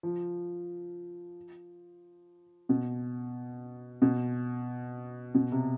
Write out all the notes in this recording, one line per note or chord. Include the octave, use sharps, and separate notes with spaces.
F3
B2
B2
B2
C3